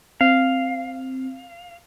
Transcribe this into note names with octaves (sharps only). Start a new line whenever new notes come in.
C4 F5